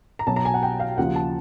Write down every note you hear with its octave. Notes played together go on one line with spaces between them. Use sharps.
A#5
B1 B2 F#3 A5
A#5
G#5
F#5
G5
F5
D#2 C#3 F3 F#5
A5